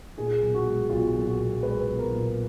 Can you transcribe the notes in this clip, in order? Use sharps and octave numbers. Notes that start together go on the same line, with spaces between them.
A#2 G#4
B1
F#4
G#3
B1 F4
A#2
F#4
B1
G#3 B4
B1
A#4
A#2